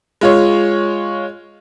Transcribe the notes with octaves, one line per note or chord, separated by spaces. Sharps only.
G#3 F4 C#5